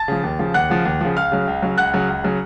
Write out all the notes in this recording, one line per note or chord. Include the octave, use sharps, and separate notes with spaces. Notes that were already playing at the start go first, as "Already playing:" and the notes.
Already playing: A5 A6
C#3 F3
D#2
C#3 F3
D#2 F#5 F#6
C#3 F3
D#2
C#3 F3
C#2 F5 F6
C#3 F#3
C#2
C#3 F#3
C#2 F#5 F#6
C#3 F#3
C#2
C#3 F#3